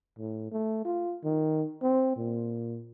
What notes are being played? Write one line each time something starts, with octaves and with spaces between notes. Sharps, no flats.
A2
A3
F4
D#3
C4
A#2